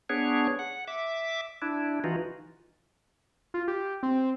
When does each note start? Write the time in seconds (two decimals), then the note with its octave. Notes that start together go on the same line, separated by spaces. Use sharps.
0.09 B3 D4 G#4 C#5
0.59 F#5
0.88 E5 D6
1.62 D4 E4
2.04 E3 D#4 F4 F#4
3.54 F4
3.68 G4
4.03 C4